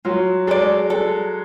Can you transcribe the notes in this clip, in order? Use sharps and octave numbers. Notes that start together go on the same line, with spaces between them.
F#3 F4
G#3 A4 D5
A4